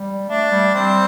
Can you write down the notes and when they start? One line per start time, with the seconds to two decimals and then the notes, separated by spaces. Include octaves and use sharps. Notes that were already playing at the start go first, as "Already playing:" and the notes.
Already playing: G3
0.28 A3 D4
0.51 G3
0.75 G3 C4